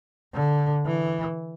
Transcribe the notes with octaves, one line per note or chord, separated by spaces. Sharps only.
D3
E3